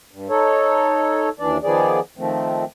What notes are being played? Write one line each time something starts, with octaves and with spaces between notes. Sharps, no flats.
G2
D#4 A4 C#5
D#2 E3 D4 D5
D#3 F3 B3 G#4 D5
D#3 F3 A3 C4